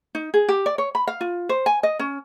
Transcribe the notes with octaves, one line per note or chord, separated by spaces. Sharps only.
D#4
G#4
G4
D5
C#5
B5
F5
F4
C5
G#5
D#5
C#4